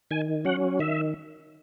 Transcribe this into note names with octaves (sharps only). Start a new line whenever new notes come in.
D#3 G#5
F#3 C#4 F#5
D#3 E5